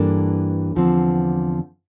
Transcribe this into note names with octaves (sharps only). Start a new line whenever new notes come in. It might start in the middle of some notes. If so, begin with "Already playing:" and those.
Already playing: G2 E3 A#3 D4 A4
E2 D3 F3 C4